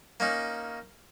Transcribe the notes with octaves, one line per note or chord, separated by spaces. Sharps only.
A#3 C#4 D#4